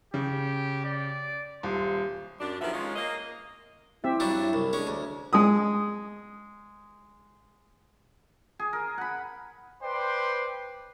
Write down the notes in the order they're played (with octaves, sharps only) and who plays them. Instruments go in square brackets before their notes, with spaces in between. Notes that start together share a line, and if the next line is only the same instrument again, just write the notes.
[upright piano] C#3 [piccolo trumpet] G4
[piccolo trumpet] D5
[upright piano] D#1 [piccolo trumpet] C6
[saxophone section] F#2 D4
D#3 F3 B3 G4 E5
G#3 C#4 D#4 F4
A#3 D#5
[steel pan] C4 G4 E5 [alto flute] E4
[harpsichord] G2 F#3 D4
C2
[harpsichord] G#3 C#4 [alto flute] D4
[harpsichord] D2
[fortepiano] G#3 D#6
[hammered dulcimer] G#4
A#4
F#5 B5
[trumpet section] B4 C5 D5 G5 C6